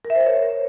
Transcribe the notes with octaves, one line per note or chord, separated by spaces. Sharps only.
A#4
E5
C5
A#4
C#5